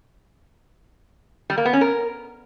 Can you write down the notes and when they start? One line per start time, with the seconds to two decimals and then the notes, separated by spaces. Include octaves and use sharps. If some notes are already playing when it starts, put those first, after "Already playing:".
1.50 G3
1.58 A#3
1.65 B3
1.73 C#4
1.81 A#4